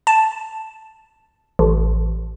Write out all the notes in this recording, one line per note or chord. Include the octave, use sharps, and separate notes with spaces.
A5
A1